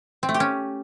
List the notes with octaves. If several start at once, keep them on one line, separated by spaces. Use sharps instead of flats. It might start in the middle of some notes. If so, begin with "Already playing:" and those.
C4
A3
G4
C#4